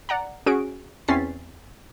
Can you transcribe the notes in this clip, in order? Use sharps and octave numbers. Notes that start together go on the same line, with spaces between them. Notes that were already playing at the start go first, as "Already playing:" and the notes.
D5 F#5 A#5
C#4 F#4 G#4 D7
E2 C4 C#4 A6 B6 C7